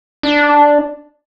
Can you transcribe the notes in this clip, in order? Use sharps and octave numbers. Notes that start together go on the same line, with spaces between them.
D4